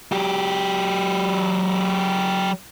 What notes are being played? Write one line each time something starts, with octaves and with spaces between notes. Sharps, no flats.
F#3 G4